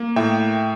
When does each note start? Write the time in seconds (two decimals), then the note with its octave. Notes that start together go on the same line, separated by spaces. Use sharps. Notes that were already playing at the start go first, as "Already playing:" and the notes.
Already playing: A#3
0.16 A2 E5 G5